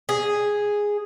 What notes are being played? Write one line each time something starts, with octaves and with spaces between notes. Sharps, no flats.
G#4